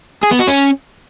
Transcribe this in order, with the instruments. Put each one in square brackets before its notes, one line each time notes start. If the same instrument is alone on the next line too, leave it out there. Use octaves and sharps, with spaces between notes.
[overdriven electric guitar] G#4
B3
F#4
C#4